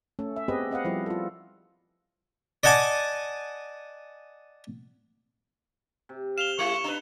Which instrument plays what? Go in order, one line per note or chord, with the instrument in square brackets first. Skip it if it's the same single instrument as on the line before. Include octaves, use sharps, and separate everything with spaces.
[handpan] A3 C#4 A4
E5
B3 C4 G4 G#4 B4 D#5
C4 D#5 F5 F#5
F3 G3 E4
F4 A4
[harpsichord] D5 D#5 F#5 G#5 A5 D6
[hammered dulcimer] C3
[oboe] F5 [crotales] E7 F7 G7
[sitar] G3 E4 [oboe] C#6
[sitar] D4 B4